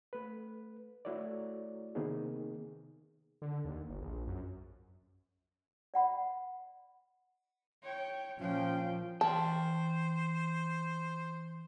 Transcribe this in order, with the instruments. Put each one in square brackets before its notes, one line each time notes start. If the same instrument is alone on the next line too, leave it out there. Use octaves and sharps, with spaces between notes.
[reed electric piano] A3 B4
A3 E4 F#4 C#5 D5
C3 D#3 A#3 B3 D#4 G#4
[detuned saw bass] D3
D#2
G1
A#1
F#2
[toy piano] D5 F#5 B5
[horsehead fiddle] C#5 G5
[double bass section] A#2 F3 [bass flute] C#4 [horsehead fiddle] F5 G5
[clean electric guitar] E3 G5 [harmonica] C5 [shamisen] A5